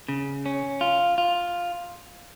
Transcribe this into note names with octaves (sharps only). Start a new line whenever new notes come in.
C#3
C#4
F4
F4